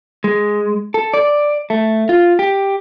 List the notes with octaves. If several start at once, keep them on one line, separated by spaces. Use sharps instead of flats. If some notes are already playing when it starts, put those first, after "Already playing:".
G#3
A4
D5
A3
F4
G4